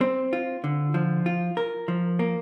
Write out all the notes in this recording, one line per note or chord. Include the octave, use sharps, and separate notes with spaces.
C4
F4
D3
F3
F4
A#4
F3
A#3